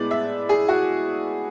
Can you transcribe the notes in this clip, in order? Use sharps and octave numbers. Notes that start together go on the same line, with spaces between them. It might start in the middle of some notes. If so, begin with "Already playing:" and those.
Already playing: A2 G#3 B3 D5
E5
G#4
F#4